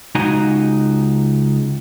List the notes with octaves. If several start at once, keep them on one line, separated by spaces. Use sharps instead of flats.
C#2 D#4 F#4 G#5